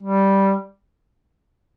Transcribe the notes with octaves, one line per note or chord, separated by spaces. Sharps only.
G3